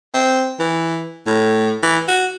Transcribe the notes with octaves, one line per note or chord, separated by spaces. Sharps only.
C4
E3
A2
E3
F#4